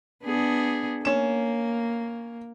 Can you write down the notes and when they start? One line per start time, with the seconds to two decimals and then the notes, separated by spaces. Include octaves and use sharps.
0.24 B3 D4 G#4
1.05 A#3 C#4 E7